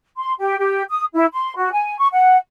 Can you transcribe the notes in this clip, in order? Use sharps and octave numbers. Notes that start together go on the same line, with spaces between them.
C6
G4
G4
D#6
E4
C6
F#4
G#5
C#6
F#5